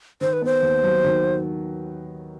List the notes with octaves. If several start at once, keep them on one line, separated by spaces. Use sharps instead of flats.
D#3 C5
B4
B3 C5
D#2
F#3
D#3